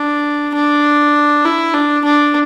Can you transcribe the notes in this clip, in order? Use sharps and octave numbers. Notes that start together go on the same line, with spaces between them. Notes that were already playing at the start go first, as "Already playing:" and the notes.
Already playing: D4
D4
E4
D4
D4